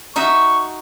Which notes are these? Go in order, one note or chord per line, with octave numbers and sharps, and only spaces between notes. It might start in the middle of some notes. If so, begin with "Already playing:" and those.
D#4 F#4 E5 C#6